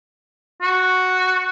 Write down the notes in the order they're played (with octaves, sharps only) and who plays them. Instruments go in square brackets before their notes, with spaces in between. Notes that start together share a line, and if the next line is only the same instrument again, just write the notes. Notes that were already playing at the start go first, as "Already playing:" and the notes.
[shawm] F#4